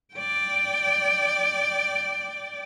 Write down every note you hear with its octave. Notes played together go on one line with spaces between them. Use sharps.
D5 G5